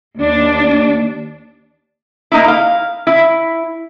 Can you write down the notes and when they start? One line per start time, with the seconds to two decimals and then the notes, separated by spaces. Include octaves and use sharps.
0.17 D#2 D4
2.32 A#3 D#4 E4
2.48 F5
3.07 E4